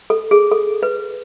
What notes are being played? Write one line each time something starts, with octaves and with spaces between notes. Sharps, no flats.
A4
G#4
A4
B4